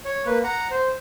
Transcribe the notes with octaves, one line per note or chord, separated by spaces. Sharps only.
C#5
A#3 B4
F#5 A#5
C5